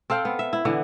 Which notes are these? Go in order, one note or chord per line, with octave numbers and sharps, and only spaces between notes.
C4 A4 F5 G5
B3
E5
E4
D3 E3 B3